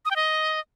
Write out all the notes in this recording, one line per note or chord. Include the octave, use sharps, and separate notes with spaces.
D#6
G5
D#5